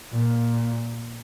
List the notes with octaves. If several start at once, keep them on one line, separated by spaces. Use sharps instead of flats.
A#2